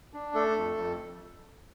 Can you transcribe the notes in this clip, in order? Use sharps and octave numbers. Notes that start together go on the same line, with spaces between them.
D4
A3 A4
F2
F2